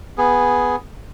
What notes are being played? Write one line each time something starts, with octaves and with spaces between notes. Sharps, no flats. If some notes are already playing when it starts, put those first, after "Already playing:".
B3 G#4